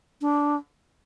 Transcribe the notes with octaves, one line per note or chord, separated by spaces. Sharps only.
D4